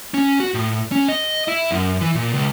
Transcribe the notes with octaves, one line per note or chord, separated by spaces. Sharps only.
C#4
F#4
A2
C#4
D#5
E4
F#2
E3
A#2
C#2